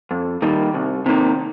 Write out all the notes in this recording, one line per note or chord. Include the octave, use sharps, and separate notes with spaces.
F2
D#3 G3 A#3
C2
C3 D#3 A#3